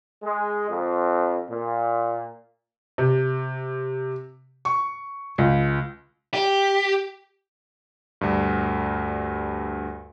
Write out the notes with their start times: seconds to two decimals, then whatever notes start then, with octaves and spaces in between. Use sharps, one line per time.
0.23 G#3
0.70 F2
1.49 A#2
2.98 C3
4.65 C#6
5.38 C#2
6.34 G4
8.21 D2 G2